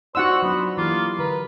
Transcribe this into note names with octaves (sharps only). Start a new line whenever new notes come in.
D#4 F4 F#4 C5 D5 F#5 E6
F#3 B3 D4
E3 A#3 F4 G4
D3 A#4 B4